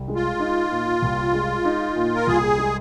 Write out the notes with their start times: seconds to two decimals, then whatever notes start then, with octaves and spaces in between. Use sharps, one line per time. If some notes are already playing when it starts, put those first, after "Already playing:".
Already playing: C2
0.08 G#3
0.15 F4
0.39 D#4
0.70 A#2
1.02 C2
1.33 G#3
1.65 D#4
1.96 A#2
2.15 A#4
2.27 C2 G#4
2.58 G#3